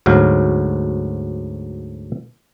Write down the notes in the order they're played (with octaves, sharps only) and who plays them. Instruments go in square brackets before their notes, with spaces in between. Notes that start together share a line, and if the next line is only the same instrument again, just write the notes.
[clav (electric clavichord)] D2 G#2 F#3 F5